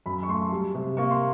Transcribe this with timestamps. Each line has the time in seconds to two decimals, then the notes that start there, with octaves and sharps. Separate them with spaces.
0.06 F#2 B5
0.23 C#6
0.29 A3 C6
0.52 G3
0.75 C3
0.97 A#3 C#6
1.11 C6